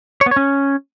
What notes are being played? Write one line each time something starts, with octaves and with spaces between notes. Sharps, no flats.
C#5
B3
C#5
C#4